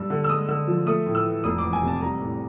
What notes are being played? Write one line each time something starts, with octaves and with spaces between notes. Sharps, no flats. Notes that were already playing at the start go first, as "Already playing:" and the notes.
Already playing: G2 G3 E6
D3
E6
G#3 D#6
D3 E6
F3
A3 D#6
A2
E6
E3
F1 D#6
D6
E2
G#5
C3
A5
G3 A#5
A2